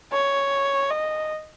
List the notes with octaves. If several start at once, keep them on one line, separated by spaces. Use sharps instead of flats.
C#5
D#5